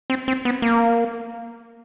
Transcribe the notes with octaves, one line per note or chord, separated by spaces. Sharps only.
C4
C4
B3
A#3